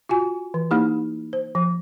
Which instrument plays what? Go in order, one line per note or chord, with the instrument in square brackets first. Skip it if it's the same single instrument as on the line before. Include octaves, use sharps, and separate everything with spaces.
[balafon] F4 F#4 G#5
E3
A#3 D#4 E4 G4
C5
F3